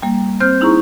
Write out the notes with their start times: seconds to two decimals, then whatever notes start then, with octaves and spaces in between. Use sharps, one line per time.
0.03 G3 A#3
0.40 C4 C5 F6 G6
0.61 D#4 E4 G#4 A#5 C#6